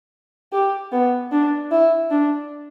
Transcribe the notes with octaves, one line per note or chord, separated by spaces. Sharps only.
G4
B3
D4
E4
D4